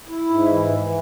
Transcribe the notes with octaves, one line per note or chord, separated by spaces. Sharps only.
E4
G#2
E3
E3